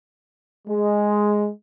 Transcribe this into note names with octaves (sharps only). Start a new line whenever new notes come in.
G#3